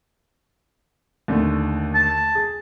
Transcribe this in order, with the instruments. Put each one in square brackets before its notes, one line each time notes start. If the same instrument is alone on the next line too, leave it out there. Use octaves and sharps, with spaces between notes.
[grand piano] D#2 D3 A3
[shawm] A5
[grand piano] G#4